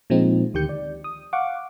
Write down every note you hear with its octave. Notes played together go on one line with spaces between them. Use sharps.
A#2 F3 G#3 C4 D#4
D2 D#3 G4 G6 C#7
D5
D#6
F5 F#5 C#6 D6